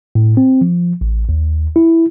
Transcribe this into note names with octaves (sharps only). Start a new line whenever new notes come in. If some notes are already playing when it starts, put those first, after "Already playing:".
A2
C4
F3
A1
D#2
E4